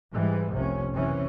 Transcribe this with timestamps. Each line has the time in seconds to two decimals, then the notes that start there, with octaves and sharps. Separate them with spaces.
0.13 G#2 E3 G3 G#3
0.54 F1 C2 C3 C#4
0.92 F#1 C3 E3 C#4